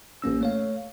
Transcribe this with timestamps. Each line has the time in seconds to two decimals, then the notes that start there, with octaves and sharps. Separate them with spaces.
0.22 A1 A#3 C#4 E6
0.41 A3 C#5 F5